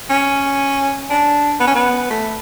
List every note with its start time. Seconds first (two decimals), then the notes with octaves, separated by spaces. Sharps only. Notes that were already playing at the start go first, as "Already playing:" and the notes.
0.10 C#4
1.10 D4
1.60 B3
1.67 C#4
1.75 B3
2.10 A3